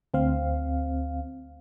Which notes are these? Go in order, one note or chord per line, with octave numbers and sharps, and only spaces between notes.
D2 C4 F5